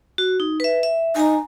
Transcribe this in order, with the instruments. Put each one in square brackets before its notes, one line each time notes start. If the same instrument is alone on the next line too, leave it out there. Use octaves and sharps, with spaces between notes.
[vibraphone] F#4
D#4
B4 E5
E5
[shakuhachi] D#4 [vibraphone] G#5 A#5